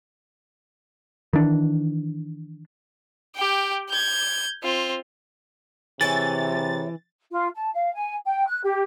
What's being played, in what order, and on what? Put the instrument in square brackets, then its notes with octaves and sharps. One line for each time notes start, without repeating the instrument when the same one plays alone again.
[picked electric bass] D#3 E3 D4
[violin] G4 G5
G6 G#6
C4 F4
[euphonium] C3 [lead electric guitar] E3 [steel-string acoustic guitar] G#4 C#5 E5 [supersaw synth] A6
[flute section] F4
A5
F5
G#5
G5
F#6
G4